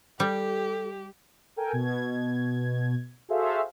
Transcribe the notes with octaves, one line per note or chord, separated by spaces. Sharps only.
G3 G4 A4
A4 A#4 G5 G#5
B2 G#6
F#4 G#4 A4 C5 E5 F5